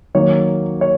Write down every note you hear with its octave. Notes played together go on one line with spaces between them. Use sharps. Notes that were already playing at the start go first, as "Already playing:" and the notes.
D#3 F#3 A#3 C#5
C#5